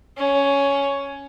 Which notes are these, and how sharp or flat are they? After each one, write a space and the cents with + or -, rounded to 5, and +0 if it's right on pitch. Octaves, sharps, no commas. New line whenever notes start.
C#4 +10